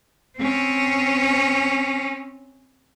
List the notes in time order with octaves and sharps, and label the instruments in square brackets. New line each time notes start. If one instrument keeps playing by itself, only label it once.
[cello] C4 C#4